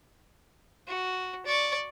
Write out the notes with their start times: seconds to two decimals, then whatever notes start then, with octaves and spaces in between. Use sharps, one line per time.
0.88 F#4
1.46 D5 C#6